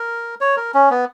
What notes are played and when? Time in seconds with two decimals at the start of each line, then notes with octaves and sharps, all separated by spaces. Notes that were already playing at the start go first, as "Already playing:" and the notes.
Already playing: A#4
0.41 C#5
0.57 A#4
0.74 C#4
0.90 B3